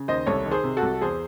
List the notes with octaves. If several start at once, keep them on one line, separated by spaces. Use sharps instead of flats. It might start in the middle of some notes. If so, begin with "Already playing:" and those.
Already playing: C#3
D#2 C5 D#5
C2 A4 C#5
D#3
G#4 C5
C3
F#4 A4
C2
E2 G#4 C5